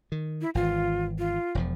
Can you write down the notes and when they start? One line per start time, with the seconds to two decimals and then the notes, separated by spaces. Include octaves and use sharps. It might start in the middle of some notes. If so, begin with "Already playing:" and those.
0.12 D#3
0.41 E4
0.55 G#1 E3 F4
1.19 F4
1.55 E1 E2 F3